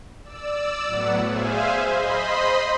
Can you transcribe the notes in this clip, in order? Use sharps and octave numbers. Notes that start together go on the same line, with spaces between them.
D5 E6
A2 F#3 B3 F#5
G#4 C5 E5 F5 G#5
C5 D#5 B5 C6